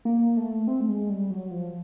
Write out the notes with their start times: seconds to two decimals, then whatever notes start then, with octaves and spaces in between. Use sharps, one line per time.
0.05 A#3
0.37 A3
0.67 C4
0.81 A3
0.89 G#3
1.09 G3
1.30 F#3
1.51 F3